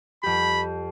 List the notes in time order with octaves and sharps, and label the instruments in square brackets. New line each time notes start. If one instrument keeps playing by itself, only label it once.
[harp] F2 G4 [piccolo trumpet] B5